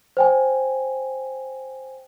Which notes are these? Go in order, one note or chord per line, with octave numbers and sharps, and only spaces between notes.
C5 G5 G#5